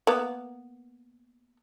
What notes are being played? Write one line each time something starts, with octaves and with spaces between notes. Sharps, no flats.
A#3 B3